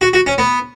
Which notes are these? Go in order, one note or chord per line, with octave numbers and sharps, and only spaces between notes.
F#4
F#4
C#4
B3